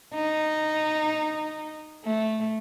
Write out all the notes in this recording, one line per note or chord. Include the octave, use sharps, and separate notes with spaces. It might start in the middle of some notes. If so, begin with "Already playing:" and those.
D#4
A3